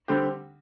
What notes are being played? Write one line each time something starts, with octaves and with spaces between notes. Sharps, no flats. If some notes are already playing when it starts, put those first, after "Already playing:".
D3 G3 C4 G4